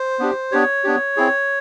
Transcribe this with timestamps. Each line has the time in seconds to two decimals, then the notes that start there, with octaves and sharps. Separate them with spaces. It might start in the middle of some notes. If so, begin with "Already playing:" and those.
Already playing: C5
0.19 B3 D4 G4
0.52 B3 D4 G4 C#5
0.84 B3 D4 G4
1.17 C4 E4 G#4